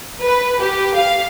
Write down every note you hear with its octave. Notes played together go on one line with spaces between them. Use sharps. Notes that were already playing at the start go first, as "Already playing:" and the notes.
B4
G4
F5